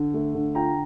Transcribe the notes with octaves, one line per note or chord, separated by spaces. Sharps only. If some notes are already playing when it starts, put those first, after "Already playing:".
Already playing: D3
A3
D3
F4 G5 A#5